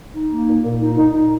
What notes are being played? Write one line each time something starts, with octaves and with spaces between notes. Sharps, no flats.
D#4
A#3
A#2
A#2
D#4
D#4
D#4